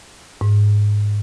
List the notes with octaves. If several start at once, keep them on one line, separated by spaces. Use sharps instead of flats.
G#2